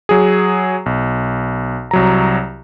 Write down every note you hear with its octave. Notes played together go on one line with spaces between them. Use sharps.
F#3 G#4
B1
C2 F#3 A#5